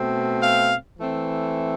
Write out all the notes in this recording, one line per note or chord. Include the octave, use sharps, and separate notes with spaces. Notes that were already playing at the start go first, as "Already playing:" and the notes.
Already playing: B2 A3 C4
F5
E3 A3 C4